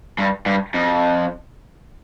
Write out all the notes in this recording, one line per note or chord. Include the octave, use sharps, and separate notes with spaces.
G2
G2
F2